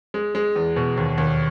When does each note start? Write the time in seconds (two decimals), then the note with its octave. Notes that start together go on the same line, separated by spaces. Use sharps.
0.14 G#3
0.35 G#3
0.56 E2
0.76 B2
0.97 D#2
1.18 D#2